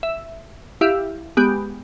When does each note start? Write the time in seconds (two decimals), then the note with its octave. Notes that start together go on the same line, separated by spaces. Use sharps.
0.03 E5
0.81 E4 G4 E5 F5
1.37 G#3 B3 G4